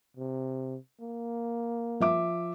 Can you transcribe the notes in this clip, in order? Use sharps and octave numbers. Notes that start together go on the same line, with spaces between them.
C3
A#3
F3 E5 D6